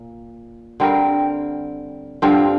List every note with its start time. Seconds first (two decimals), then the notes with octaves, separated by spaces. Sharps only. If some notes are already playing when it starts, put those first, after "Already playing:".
Already playing: A#2
0.80 D3 G3 C4 A#4
2.22 G2 D3 F3 C4